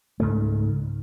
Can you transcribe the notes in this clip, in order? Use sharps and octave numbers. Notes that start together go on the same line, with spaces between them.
C#2 G#2 A3